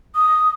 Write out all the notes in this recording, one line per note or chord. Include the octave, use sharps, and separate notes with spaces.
D#6